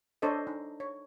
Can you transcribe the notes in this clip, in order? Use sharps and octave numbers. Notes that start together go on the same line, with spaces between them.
D4 A4 C5 C#5 D#5
D#4
C#5